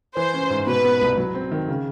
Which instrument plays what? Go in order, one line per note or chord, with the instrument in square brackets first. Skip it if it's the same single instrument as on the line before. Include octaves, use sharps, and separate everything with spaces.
[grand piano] E3 [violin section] C5
[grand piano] C#4
G#2
[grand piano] B2 [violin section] B4
[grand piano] B3
C2
F#3
C4
D#3
C#3